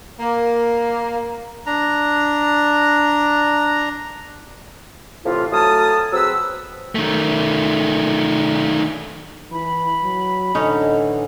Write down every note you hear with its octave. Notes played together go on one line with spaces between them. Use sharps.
A#3
D4 A#5
A2 C3 E3 F4
F#3 A3 G#5 A5 D#6 F6
F#3 C4 G#4 B4 E6
D#3 A3
E3 B5
F#3
A2 D3 E3 C#4 D#4 A4